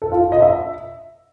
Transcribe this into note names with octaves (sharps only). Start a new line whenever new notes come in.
A4
F4
F4
D#5
E5